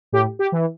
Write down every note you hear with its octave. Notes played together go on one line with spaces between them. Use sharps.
A2 G4
G4
E3